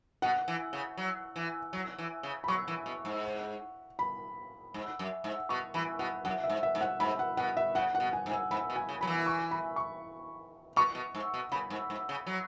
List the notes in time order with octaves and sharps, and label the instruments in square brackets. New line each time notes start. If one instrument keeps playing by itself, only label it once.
[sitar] B2 [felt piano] F#5
[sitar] E3
C#3
F#3
E3
F#3
E3
C#3
[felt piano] B5
[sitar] F#3 [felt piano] C#6
[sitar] E3
B2
G#2
[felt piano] B5
[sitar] G#2
F#2
G#2
[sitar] B2 [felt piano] C#6
[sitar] E3 [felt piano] B5
[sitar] B2 [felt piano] F#5
[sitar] F#2 [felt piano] F#5
[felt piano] E5
[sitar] G#2
[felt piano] E5
[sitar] G#2
[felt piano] F#5
[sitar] G#2 [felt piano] B5
[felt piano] F#5
[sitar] B2 [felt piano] F#5
[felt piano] E5
[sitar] C#3 [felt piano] F#5
[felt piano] F#5
[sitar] B2
[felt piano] G#5
[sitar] G#2
[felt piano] G#5
[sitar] G#2 [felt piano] B5
[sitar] B2
[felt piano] G#5
[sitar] C#3
[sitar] F#3 [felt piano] B5
[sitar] E3
[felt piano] C#6
B5
C#6
[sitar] B2 [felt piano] C#6
[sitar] B2
G#2
B2
[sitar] C#3 [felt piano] B5
[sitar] G#2
G#2
C#3
F#3